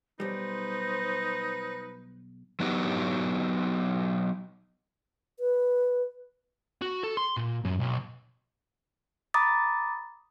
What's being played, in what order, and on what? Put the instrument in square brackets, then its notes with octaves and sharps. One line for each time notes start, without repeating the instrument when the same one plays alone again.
[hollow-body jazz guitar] B1 G3 [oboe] D#4 [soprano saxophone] B4 [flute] C5
[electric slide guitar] F#3 B3 D#4 G4
[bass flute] B4
[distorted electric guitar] F#4
A4
C6
A#2
F#2
B1
[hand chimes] A#5 B5 D6 D#6 A6